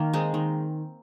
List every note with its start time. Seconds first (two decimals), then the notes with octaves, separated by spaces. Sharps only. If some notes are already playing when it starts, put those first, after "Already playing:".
Already playing: D#3 A#3
0.13 G#3 C4 D#4
0.34 D#3